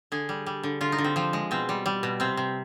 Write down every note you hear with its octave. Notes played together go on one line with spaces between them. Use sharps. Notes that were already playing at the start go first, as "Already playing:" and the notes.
D3 G#4
G3
G3
D3
D3 F4
D#4
D3
C4
F3 C4
G#3
B2 C4
G3
G3
B2
C3 C4
C3